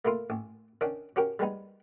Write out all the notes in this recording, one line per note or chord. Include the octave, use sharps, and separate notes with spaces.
A3 A#3 E4 F4
A1
D#3 C#4 D4 F#5
C#4 F#4 G4 A#4
G3 G#3 B3 D#4